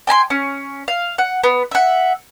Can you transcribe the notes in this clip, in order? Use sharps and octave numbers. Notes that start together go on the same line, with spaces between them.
G5 G#5 A#5 C6
C#4
F5
F#5
B3
E5 F#5